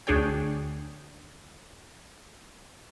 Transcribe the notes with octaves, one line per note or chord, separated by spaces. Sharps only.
D2 D4 G#4 C#5 G5